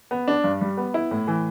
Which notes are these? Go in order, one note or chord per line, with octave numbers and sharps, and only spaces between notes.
B3
D4
G2
G3
B3
E4
A2
E3